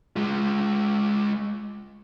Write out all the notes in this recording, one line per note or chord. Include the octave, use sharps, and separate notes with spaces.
G#3 F4